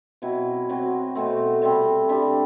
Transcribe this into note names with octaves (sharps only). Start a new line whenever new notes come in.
B2 F#3 C4 E4
F#3 C4 F#4
B2 A3 C4
C3 G3 C4
G3 D4 G4